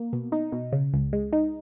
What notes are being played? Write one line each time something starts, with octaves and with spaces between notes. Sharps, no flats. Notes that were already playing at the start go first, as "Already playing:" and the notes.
Already playing: A#3
B2
D#4
B2
C#3
C#2
G#3
D#4